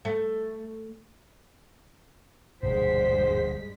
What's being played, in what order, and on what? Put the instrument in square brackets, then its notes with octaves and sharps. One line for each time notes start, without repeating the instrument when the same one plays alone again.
[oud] A3
[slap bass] E1 D2 A#2 [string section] G2 G#3 B6 [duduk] C5